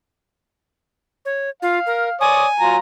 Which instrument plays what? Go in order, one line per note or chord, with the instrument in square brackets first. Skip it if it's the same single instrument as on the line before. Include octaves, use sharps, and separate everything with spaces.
[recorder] C#5
[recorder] F4 [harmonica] F5
[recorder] A#4
[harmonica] C#5 D5 D#6 [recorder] G#5
[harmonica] F#3 F4 A#5